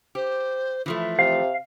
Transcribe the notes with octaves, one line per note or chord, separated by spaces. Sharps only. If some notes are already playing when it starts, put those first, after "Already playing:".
G4 C5
E3 F3 A3 F4
C3 F5